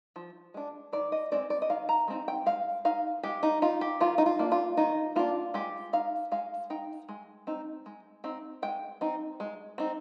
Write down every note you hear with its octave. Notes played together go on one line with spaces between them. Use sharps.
F3
G#3 D4
D#3 D5
D#5
G#3 C4 D#4 D5
D5
D#5
D#3 F5
A#5
G#3 C4 D#4
G5
G#3 F5
D#4 F5
G#3 G4
D#4
D#4 F4
G4
D#3 F4
D#4
F4
A#3 D4
F4
D#3 D#4
A#3 D4 F4
G#3 G4
D#4 F5
G#3 F5
D#4 G5
G#3
C4 D#4
G#3
C4 D#4
G#3 G5
C4 D#4
G#3
C4 D#4